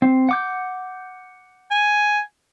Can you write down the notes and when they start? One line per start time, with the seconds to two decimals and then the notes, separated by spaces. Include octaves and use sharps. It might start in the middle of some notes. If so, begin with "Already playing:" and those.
0.02 C4
0.29 F#5 D6 G6
1.71 G#5